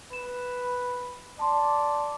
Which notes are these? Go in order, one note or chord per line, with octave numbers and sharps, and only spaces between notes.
B4 E7
D5 A5 C6